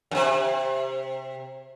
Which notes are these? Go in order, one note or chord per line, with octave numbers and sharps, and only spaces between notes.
F#2 C3